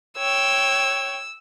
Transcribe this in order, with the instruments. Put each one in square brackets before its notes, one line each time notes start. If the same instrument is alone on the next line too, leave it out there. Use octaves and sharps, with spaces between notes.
[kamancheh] C#5 G5 [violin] E6